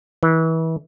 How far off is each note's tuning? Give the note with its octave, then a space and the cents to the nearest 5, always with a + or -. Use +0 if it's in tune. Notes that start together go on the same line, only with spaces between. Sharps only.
E3 -30